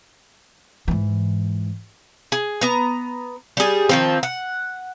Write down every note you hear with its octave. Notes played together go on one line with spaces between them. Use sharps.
G#2 E3
G#4
B3 A#5
G3 G#4
D#3 F3 C4
F#5